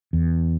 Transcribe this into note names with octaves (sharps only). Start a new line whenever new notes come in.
E2